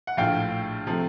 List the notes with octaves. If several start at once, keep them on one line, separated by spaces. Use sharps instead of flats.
F#5
A#1 A2 F3 F5 G5
C3 F3 A3